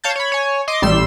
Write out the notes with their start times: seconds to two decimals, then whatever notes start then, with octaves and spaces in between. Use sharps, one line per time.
0.04 C#5 F5 A5 G6 A6
0.16 C#5 B5
0.32 C#5 G#5
0.68 D#5 C6 D6
0.82 A1 G3 C6 E6 E7